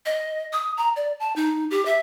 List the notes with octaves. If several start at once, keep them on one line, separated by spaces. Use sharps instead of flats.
D#5
D#6
A#5
D5
A5
D#4
G4
E5